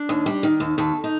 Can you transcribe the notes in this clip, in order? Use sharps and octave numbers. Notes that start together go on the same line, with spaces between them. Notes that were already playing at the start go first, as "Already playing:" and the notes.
Already playing: D4
D#2
G3
D#3
D#2
D#2 A4
D#4